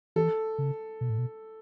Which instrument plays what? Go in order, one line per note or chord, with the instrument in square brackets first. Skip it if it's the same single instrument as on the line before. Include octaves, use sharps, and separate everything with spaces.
[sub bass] E3 [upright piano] A4
[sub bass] C#3
B2
A2
B2